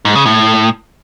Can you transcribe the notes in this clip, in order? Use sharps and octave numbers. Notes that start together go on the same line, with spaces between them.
G#2
C#3
A2